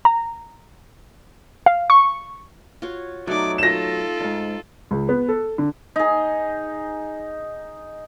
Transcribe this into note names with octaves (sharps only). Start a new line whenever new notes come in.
A#5
F5
C#6
F4 F#4 C#5
B1 F#3 A3 D#4 D5 D6
F4 A4 A#6 E7
D2 G#2
C#2
B3
A4
D3
D#4 G#4